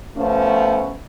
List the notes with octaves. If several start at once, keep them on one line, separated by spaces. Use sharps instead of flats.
F3 A3 B3 C#4